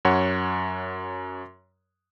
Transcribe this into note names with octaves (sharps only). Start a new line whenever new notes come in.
F#2 C#5 F#5